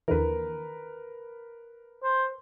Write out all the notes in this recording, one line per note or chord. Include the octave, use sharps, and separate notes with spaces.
D#2 D3 E3 A#4 B4
C5